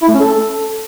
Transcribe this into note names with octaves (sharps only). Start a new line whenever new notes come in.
E4
A3
C#4
A4